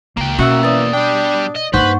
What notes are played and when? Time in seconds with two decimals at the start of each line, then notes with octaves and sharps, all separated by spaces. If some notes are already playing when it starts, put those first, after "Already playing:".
0.17 C#2 A#3 G5
0.39 B2 C#4 F#4 E5 E6
0.63 E3 D5 D#6 A6
0.93 G3 D4 G5
1.56 D#5
1.74 G2 A#3 D#4 B4 C5 F#5 C#6